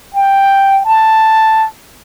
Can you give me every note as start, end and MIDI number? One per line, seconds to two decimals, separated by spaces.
0.15 0.85 79
0.85 1.66 81